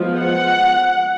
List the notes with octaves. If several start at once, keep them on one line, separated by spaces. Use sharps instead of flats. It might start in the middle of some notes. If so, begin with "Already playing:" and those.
Already playing: F3 G#3 B3
F#5